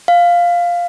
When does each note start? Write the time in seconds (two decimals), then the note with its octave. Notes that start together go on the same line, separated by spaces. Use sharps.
0.08 F5